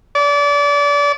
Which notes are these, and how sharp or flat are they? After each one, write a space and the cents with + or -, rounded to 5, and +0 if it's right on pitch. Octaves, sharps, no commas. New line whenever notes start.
D5 -30